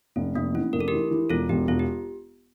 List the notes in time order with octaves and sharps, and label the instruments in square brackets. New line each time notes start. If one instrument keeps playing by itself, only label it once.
[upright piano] F1 [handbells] C#4
[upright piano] F1 [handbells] A#3
[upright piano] E3 [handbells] C#4
[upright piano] F1 [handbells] A#4
[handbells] A4
[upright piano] E3 [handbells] G4 A#4
[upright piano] E3
[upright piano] E1 [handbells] F4 A4
[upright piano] E1 [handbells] G4
[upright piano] E1 [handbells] F4
[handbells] G4